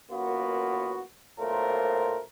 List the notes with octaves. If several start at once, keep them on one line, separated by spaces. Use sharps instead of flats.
A1 F#2 A#3 B3 F4 F#4
B1 A#2 A3 A#4 C5